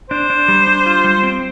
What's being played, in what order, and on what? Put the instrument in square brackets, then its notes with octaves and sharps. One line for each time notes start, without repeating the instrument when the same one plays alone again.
[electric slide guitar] D4 [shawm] C5
[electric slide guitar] D4
G3
D4
F4
G3
C4